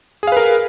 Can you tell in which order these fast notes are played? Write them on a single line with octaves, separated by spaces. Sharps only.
G#4 F5 B4 A#4